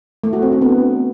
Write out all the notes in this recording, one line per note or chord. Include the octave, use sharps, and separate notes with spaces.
A3
F#4
C4
D4
B3